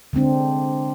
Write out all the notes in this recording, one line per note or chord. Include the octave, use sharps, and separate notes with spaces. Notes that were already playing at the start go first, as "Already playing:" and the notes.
D3 G#3 C4 D4